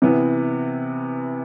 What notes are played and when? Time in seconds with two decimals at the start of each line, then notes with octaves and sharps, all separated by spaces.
0.02 C3 E3 B3